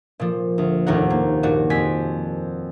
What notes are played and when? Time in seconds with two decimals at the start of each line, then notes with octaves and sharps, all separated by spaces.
0.20 A#2 F3
0.58 D2
0.86 F1 D#2 A2 A#4 F#5
1.10 A#3
1.43 G2 A#2 F#4
1.70 F2 C4 G#5 B6